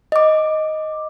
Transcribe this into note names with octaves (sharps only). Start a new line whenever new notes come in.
D#5 D6